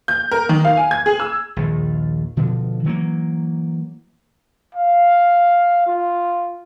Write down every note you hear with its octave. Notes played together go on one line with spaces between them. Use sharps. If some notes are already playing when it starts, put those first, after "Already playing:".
G6
A#4
D#3
F5
G#5
G#6
G#4
E6
A#1 D#2
B2 D3 F3
E3 F#3 A3 A#3
F5
F4